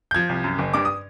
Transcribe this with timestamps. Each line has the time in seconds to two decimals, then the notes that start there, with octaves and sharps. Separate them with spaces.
0.11 G6
0.15 F3 G#6
0.29 C2
0.44 F#2
0.59 F#1
0.73 G2 D6
0.85 D#6